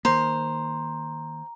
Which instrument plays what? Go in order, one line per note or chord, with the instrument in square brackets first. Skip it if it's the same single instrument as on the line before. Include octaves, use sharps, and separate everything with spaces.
[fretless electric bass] D#3 A#3 [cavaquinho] C5 [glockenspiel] A#5